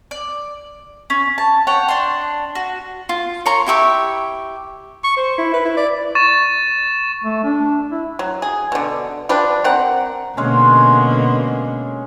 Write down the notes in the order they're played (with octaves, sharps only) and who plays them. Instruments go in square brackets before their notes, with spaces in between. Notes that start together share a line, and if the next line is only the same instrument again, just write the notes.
[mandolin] D5
C#4
A5
C#5 F#5 G5
D4 C6
F#4
[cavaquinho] F4
C#5 A#5 C6 C#6
E4 G4 E5 C#6
[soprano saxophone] C#6
C5
E4
B4
E4
D5
[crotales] C#6 A6 E7
[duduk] A3
D4
E4
[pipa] F#3
G#4
B2 D3
F3 G3 D4 B4
C4 A#4 F#5
[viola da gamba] B2 D3 A#3 [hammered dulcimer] G#3 C#4